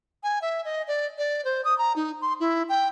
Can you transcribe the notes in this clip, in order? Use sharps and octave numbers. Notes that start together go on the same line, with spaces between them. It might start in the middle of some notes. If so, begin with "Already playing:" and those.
G#5
E5
D#5
D5
D5
C5
D#6
A#5
D#4
C6
E4
G5